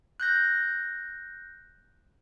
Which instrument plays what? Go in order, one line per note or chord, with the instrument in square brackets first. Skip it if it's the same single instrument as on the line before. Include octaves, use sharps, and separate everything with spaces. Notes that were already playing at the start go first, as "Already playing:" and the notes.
[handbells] F#6 G6 A#6